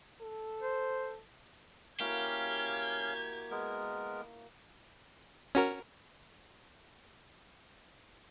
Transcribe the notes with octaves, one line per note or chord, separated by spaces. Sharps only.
A4
C5
A#3 C#4 E4 F#4 G4 F5 G#6
G#3 B3 A#4
C#4 F#4 A#4